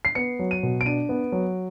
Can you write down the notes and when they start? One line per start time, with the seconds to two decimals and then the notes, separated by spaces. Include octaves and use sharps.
0.05 C7
0.15 B3 C#7
0.39 F#3
0.51 D#7
0.63 B2
0.81 D7
0.85 D4 D#7
1.09 B3
1.32 F#3